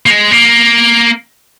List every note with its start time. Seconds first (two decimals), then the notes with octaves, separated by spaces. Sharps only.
0.06 A#3
0.10 G#3
0.31 A#3